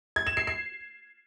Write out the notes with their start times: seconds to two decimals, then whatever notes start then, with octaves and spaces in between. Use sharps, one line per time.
0.16 G#6
0.27 E7
0.37 C7
0.47 C7